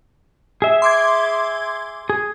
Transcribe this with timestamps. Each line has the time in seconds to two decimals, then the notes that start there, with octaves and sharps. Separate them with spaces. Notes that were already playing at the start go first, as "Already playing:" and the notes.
0.62 G#4 E5
0.82 C6 D6 G#6
2.10 G#4